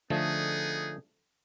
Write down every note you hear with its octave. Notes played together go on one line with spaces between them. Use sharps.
D3 F3 A3 B3 D#4 G#4